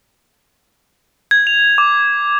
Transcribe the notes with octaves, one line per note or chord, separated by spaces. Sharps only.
G#6
F7
D6